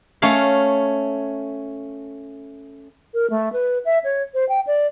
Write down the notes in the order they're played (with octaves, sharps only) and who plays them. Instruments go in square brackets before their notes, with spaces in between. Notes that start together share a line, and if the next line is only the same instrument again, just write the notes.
[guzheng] A3 C#4 C#5 F5
[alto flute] A#4
A3
B4
E5
C#5
C5
G5
D5